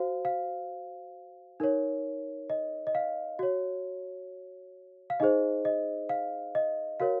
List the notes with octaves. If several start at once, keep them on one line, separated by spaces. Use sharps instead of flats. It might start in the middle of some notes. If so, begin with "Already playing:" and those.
Already playing: F#4 C5 F5
F5
D#4 A#4 C#5
D#5
D#5
F5
F#4 C#5
F5
D#4 G#4 C5 D#5
D#5
F5
D#5
F#4 A#4 C#5 F5